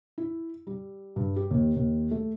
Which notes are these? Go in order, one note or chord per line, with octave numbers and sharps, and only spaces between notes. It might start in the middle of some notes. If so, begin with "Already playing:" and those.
E4
G3
G2
G4
D#2
D#2
A3